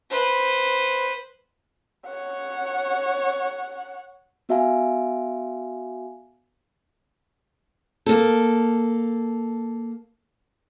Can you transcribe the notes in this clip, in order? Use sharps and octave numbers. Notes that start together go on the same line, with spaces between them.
B4 C5
C#5 F#5
B3 F#4 E5 F5 G#5
A#3 A4